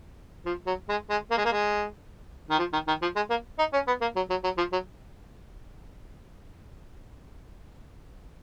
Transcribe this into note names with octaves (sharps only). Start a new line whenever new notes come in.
F3
F#3
G#3
G#3
A#3
G#3
A#3
G#3
D#3
F3
D#3
D#3
F3
G#3
A#3
D#4
C#4
B3
A#3
F#3
F#3
F#3
F3
F#3